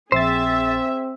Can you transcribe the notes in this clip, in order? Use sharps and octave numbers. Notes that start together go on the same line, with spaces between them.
A#1 C4 G#4 C5 E5 A6